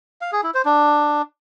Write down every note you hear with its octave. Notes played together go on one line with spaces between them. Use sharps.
F5
G#4
E4
C5
D4